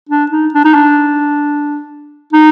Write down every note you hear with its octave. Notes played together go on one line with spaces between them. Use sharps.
D4
D#4
D4
D#4
D4
D#4